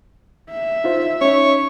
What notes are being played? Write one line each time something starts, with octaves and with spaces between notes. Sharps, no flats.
E5
D#4 F4 C5
C#4 D#4 C#5